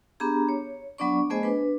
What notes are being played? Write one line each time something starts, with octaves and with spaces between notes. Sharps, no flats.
B3 D4 G4 G#4 A#5
C#5
F#3 B3 D4 D5 C#6
A3 B3 G#4 C5 D#5 G#5
D4 B4